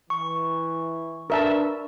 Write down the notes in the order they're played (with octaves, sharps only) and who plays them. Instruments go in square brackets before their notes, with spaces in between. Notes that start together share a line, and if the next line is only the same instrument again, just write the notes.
[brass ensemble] E3 [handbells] C#6
[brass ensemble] D4 B4 [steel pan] A#4 E5 A5